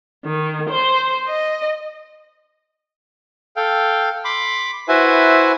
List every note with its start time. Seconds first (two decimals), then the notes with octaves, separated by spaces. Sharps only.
0.24 D#3
0.69 C5
1.27 D#5
3.56 A4 F5 G5
4.25 B5 C6 D6
4.88 E4 F#4 B4 C5 E5 G#5